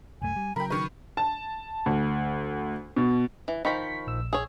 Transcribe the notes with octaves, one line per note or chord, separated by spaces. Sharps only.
C2 F#2 A3 G#5
G3
C#3 F#3 A#4 G5 B5
D#3 B4 C#6
A5
D2
B2
E3
D#3 F3 C5 B5 C#6 B6
A#1 E6
G#4 C#5